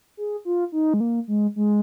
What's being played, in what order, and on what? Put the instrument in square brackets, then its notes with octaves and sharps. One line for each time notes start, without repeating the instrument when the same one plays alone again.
[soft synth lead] G#4
F4
D#4
G#3
A#3
G#3
G#3